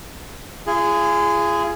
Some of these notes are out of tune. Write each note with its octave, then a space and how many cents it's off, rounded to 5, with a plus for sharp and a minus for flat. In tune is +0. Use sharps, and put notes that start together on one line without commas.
F4 -40 G#4 +0